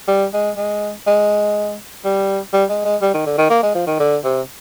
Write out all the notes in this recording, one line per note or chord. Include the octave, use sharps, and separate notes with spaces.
G3
G#3
G#3
G#3
G3
G3
G#3
G#3
G3
D#3
D3
D#3
A#3
G#3
F3
D#3
D3
C3